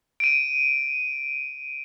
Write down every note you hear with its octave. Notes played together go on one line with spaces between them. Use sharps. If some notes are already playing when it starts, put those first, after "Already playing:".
D7 D#7